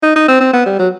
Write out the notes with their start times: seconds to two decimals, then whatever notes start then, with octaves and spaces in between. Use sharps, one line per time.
0.02 D#4
0.15 D#4
0.28 C4
0.40 C4
0.53 B3
0.66 G3
0.79 F#3